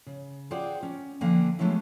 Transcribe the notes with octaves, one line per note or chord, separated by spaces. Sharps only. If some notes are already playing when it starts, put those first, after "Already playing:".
C#3
F4 G#4 C5 D5 F#5 G5
C#4
D3 F3 A#3 B4 G5 G#5
F#3 G#3 A3 B3 C#4 E4